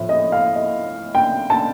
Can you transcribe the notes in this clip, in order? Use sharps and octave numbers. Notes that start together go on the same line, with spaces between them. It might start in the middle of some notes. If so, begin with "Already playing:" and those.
Already playing: A2 F3
D#5
F5
D#5
G5
A5